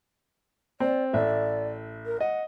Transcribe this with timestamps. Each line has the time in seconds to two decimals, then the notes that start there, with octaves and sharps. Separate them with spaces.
0.80 C4 D5
1.13 A1 D5 E5
2.05 A#4
2.20 D#5 F#5